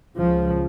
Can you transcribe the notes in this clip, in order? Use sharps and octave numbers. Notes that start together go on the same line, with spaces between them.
C#2 C#3 F3